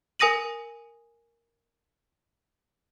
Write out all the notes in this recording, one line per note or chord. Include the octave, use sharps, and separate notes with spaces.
A#4 G#5 D#6 A#6 D#7 F#7